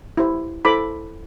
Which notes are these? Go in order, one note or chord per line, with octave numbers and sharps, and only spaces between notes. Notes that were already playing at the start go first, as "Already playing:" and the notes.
E4 G4 C5
E4 A4 C5 B5 D6